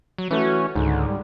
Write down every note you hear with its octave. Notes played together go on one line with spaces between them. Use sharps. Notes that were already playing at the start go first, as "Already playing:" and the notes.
F#3
E3 A3 C#4 F#4
C#2 G#2 D3
G3